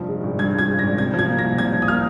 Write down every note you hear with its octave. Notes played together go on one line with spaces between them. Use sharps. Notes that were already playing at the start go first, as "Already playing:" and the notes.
Already playing: F1 G2 F3
G#3
G#1
G2 G#6
F3 G#6
G#3
A#6
G#1
C3 G#6
F3
G#6
A#3
A#6
C2
C3 G#6
F3
D#6
A#3 F6